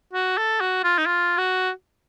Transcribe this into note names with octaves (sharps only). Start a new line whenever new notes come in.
F#4
A4
F#4
F4
D#4
F4
F#4